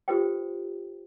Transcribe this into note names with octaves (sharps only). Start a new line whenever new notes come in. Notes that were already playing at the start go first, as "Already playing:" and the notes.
F4 G4 A4 B4 C5 G5